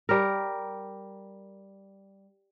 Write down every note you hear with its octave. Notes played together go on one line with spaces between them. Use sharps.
G3 A#4